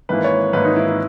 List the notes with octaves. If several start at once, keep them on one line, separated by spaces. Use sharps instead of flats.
G#1 G#2 E3 A#3 B4
C#5
G#1 G#2 E3 A#3 B4
D#4
E4
E4